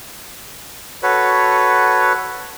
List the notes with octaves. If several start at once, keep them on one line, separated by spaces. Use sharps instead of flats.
F#4 A4 B4 C#5